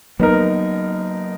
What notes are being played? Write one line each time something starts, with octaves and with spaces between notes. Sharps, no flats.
F#3 A#3 B3 D#4 A#4